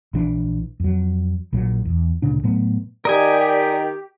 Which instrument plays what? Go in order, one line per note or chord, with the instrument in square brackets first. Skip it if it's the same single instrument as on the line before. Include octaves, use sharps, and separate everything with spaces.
[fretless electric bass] A#1 E3 D4
F2 F#3
A#1 A#2 F#3
E2
D2 A#2 C#3 D4
A2 F#3 A3 B3
[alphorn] D#3 [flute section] G4 [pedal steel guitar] A#4 D#5 G#5 [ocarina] D5